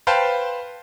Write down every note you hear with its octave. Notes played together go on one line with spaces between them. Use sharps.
B4 C5 F5 G5 A5